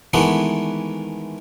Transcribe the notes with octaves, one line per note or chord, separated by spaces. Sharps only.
D#3 E3 G#3 A3 B3